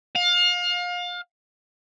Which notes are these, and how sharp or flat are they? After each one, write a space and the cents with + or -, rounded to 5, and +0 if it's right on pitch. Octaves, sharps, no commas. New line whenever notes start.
F5 +30